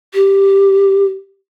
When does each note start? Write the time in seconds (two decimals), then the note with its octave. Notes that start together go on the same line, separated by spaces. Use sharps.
0.14 G4